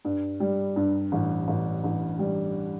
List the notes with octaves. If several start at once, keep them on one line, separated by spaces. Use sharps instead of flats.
G2
G3
G2
A1
A1
A1
G3